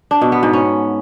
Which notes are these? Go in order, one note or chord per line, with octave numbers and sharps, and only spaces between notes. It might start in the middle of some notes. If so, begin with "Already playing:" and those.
D4
B2
B3
G#2
C#4